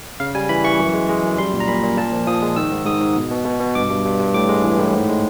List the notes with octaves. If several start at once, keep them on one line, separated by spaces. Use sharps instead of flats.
C#3 F5
G3 G#5
E3 B5
E3 C#6
F#2
G#3
G#3
F#2
G3 C6
A#2
A#5
A#2 B5
A#2
A#2 A5
F3
F3 D#6
G#3
D#3 E6
G#2
G#2 D#6
G#2
B2
B2
B2
B2
G2 D6
G2
G2
G2
A2 D6
G#3
E3
A2
G#2
G#3